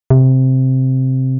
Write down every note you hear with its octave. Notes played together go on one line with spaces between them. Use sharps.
C3